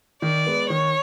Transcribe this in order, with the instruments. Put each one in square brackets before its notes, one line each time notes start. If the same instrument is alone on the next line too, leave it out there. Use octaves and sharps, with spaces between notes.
[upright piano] D#3 [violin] D5
[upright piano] G#3 B3
[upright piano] D#3 [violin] C#5